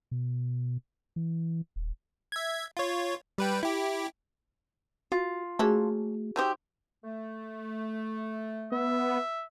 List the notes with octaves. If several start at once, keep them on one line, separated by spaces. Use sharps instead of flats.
B2
E3
D#1
E5 G#6
F4 C#5
G3 B4 G5
E4 G4
F4 F#4
A3 A#3 C#4 F#4 G#4 A4
F#3 D#4 G4 C5 E5 G5
A3
B3 E5